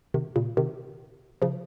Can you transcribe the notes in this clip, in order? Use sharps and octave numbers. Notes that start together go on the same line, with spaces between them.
C3 D#3
A#2 C#3
C3 D#3
C#3 F3